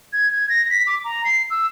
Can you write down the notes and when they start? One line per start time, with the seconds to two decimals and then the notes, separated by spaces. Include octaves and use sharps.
0.13 G#6
0.33 G#6
0.49 A#6
0.70 B6
0.87 D6
1.04 A#5
1.25 C7
1.50 E6